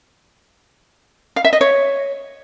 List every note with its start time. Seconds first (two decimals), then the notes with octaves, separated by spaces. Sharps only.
1.36 F5
1.45 E5
1.53 D#5
1.61 C#5